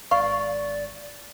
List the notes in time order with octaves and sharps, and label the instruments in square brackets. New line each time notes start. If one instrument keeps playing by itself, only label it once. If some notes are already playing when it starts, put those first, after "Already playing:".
[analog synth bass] G#1 [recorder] D5 [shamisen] F5 [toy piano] C#6